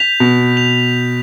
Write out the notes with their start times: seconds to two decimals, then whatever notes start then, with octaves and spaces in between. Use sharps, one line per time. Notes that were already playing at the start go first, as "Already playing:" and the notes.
Already playing: G6 B6 F7
0.20 B2
0.57 F7